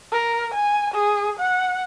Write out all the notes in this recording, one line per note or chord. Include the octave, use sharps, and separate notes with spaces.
A#4
G#5
G#4
F#5